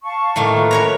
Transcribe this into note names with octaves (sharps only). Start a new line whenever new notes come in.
F5 A5 C#6
A2 D#3 A#3
F4 B4 C#6
A#4 B4 C#5 G5 A#5 B5